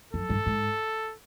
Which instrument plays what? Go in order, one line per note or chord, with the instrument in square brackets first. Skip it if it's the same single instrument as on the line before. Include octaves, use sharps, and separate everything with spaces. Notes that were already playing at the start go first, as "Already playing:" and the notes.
[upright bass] F#2 [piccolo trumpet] A4
[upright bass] G2
G#2